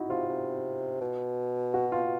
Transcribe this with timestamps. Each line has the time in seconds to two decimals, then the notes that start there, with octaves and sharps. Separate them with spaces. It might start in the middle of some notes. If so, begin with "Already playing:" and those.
Already playing: D#4 E4 F#4
0.09 C3 F4
0.29 C3
1.01 B2
1.74 F#4
1.92 F4